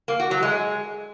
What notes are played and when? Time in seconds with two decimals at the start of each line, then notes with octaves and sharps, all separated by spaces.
0.08 A#3
0.20 F#4
0.31 F#3
0.43 G#3